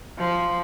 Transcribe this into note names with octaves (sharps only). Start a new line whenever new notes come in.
F3